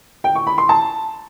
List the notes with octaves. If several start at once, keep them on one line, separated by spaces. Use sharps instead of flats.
G5
C#6
B5
C6
A5